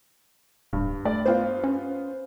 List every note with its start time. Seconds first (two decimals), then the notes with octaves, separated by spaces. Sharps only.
0.73 D1 G2
1.05 A3 D5
1.26 B3 F4 C5
1.64 C#4